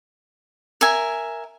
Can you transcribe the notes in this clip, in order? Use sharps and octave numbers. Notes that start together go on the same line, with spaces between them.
A#4 E5 G#5